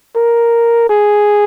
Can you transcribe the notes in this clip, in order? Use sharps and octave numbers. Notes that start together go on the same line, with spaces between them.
A#4
G#4